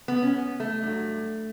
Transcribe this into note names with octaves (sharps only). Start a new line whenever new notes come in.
B3
C#4
B3
A3
G2 F#3